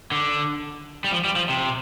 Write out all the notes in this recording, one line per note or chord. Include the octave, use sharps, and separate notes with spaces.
D3
G3
F3
G3
F3
C3